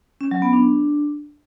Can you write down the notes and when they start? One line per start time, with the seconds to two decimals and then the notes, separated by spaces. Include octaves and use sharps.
0.21 C#4
0.31 F#3
0.42 B3
0.53 D4